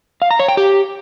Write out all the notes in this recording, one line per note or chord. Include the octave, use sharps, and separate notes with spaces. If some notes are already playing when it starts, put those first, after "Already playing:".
F5
A#5
C#5
G5
G4